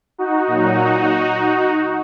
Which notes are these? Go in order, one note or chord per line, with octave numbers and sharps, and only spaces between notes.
D#4 F#4
A#2 F#3